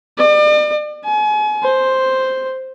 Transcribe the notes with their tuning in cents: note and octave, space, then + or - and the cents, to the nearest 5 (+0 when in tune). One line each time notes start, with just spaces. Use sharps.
D5 +40
G#5 +35
C5 +0